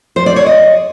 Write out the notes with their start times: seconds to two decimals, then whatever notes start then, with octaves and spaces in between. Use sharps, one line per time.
0.16 C5
0.26 D5
0.36 C#5
0.46 D#5